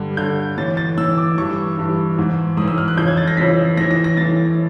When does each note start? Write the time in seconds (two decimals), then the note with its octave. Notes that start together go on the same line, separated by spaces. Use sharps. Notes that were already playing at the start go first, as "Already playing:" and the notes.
Already playing: G2 D3
0.17 G2 D3 G6
0.58 A2 E3 A6
0.77 A6
0.98 A2 E3 E6
1.18 D6
1.38 G2 E3 C#6
1.77 G2 E3
2.18 G#2 E3
2.57 G#2 D#6
2.62 E3
2.68 E6
2.78 F6
2.88 F#6
2.97 F2 C#3 E3 G6
3.08 G#6
3.17 A6
3.28 A#6
3.37 F2 C#3 E3 B6
3.77 A2 E3 A#6
3.91 A#6
4.04 A#6
4.17 A2 E3 A6